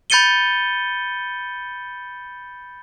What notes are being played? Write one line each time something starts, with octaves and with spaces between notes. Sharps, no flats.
B5 G6 A6 C#7 D#7 G7